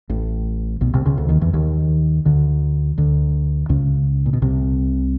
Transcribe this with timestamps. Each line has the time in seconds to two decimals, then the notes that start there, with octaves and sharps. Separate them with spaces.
0.10 A1 A2
0.81 B1 B2
0.93 C2 C3
1.05 C#2 C#3
1.18 D2 D3
1.29 D#2 D#3
1.41 E2 E3
1.53 D#2 D#3
2.25 D2 D3
2.98 D2 D3
3.69 C#2 C#3
4.26 A#2
4.33 B2
4.42 C2 C3